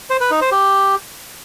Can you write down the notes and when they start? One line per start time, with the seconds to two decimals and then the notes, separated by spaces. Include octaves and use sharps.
0.10 C5
0.21 B4
0.31 D#4
0.41 C5
0.52 G4